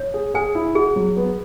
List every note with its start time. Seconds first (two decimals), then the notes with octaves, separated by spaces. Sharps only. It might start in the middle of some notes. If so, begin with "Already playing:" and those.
Already playing: C#5
0.14 G#4
0.34 G#4 G#5
0.55 E4
0.75 F#4 G#4
0.96 F#3
1.17 B3